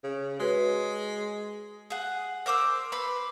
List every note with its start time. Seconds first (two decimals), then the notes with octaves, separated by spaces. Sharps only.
0.04 C#3
0.40 G#3 F#4 B4 C#5
1.90 G#4 F#5
2.46 A#4 C5 D6 E6
2.92 B4 B5 C6 D6